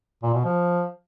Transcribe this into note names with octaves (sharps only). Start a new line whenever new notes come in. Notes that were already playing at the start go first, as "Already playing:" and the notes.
A#2
B2
F3